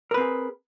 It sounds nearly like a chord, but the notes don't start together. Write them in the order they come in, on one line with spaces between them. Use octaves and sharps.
A#4 B4 C4 G#4